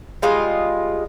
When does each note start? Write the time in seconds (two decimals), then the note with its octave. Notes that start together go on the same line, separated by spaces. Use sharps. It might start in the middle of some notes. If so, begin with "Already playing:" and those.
0.22 G3 G#3 F4 D#5